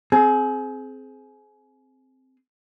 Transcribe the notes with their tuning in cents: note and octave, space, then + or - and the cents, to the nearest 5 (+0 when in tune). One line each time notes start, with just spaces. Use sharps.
C4 +0 G#4 +30